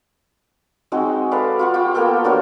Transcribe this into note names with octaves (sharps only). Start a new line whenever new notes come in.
G#3 C4 D#4 F#4
A4 B4 D5 F5
F4 F#5 C#6
F4 G4 G5
A#3 B3 A4 G5
D4 F#4 A#4 C#5